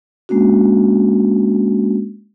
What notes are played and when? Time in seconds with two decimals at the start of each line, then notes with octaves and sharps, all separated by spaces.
0.29 G#3 A#3 C#4 D4 F#4